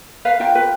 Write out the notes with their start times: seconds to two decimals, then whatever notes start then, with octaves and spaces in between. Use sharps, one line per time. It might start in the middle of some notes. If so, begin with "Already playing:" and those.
0.25 B4 F5
0.40 F4 G5
0.55 B4